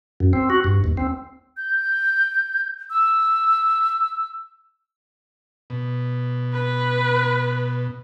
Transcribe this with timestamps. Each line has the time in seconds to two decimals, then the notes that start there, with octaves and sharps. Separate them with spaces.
0.20 F#2
0.33 C4
0.50 F#4
0.64 G2
0.84 D#2
0.97 C4
1.57 G6
2.90 E6
5.70 B2
6.54 B4